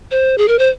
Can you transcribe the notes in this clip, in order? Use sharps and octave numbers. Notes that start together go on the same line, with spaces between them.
C5
G#4
A#4
C5